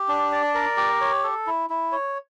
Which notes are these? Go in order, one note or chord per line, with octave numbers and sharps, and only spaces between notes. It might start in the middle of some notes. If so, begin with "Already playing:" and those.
Already playing: G4
D4
D5
A#4
G4
C#5
A4
E4
E4
C#5